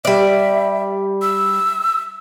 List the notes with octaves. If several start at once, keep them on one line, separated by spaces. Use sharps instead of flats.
G3 D5 E5
E6